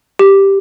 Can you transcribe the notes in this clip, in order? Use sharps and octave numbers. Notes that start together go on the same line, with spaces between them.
G4